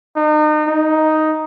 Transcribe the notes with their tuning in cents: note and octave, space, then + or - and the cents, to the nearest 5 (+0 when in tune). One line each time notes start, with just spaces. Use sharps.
D#4 -35
D#4 +5